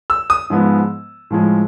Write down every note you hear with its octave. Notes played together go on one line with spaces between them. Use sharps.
E6
D#6
G#2 F3 G#3 B3
A2 F3 G#3